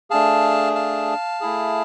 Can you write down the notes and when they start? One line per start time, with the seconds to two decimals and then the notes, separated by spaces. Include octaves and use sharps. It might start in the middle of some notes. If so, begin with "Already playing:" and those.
0.10 A3 D4 G#4 F5 A5
0.75 F5 A5
1.40 A3 E4 G#4